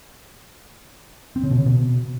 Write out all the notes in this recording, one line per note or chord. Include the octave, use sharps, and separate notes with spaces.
C4
C#3
B2
C#3
B2